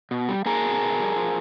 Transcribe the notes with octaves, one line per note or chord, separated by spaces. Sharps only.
B2
G3
A#3 G#4 A#4
B2
B2
G3
F3